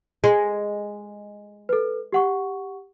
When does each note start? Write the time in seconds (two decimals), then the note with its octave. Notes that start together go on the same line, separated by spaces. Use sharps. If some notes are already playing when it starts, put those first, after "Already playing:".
0.24 G#3
1.69 A4 B4
2.13 G4 F#5 C#6